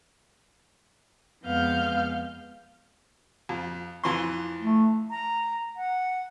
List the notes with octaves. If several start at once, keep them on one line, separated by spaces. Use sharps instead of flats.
F2 G#3 B3 F5 F6 G6
F2
F2 E3 C6
A3
A#5
F#5